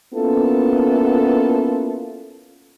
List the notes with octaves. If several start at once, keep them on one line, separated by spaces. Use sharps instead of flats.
A#3 B3 C#4 E4 F4 A4